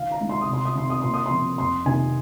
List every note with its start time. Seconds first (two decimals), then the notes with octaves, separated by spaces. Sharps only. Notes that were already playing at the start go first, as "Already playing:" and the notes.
Already playing: D#3 F5
0.11 A#5
0.20 G#3 D#4
0.29 C6
0.41 D#6
0.48 C3
0.53 C6
0.65 D#6
0.75 D#3 C4 C6
0.90 D#6
1.01 A#2 C6
1.14 D#6
1.26 C6
1.31 F3 C4
1.58 F2 C6
1.86 C3 D#3 A#3 D#4 G#5